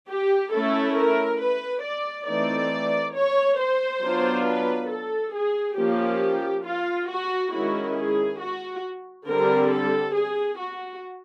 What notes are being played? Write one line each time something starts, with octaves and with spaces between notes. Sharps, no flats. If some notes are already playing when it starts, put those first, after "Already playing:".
G4
A3 C#4 E4 A4
A#4
B4
D5
E3 A3 C4 D#4 D5
C#5
C5
F#3 B3 D4 F4
B4
A4
G#4
F3 A#3 C#4 G4
F4
F#4
D#3 G#3 C#4 E4 F#4
G#4
F#4
D3 G3 C4 A#4
A4
G#4
F#4